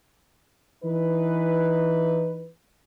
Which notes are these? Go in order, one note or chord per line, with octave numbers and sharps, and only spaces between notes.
E3 D#4 B4